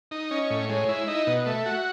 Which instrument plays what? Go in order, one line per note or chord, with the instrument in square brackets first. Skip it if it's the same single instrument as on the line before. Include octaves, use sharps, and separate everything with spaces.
[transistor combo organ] D#4
[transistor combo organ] C#4 [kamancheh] D#5
[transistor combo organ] A2
[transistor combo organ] G#3 [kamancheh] C#5
[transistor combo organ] E4
[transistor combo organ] D#4 [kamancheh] D#5
[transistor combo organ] B2
[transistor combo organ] A3 [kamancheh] E5
[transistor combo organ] F#4